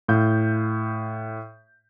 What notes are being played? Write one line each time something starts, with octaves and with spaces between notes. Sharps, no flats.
A2 F5 G6